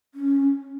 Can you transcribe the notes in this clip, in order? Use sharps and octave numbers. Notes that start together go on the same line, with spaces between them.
C#4